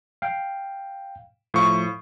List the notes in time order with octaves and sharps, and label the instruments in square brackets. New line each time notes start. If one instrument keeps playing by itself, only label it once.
[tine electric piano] F5 G5
[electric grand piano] A2 C#6 [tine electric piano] F3 F5